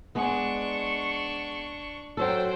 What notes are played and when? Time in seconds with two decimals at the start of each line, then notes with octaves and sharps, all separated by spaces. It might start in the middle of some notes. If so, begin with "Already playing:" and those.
0.15 G#3 B3 D4 C#6
2.17 F#3 A4 C5 G5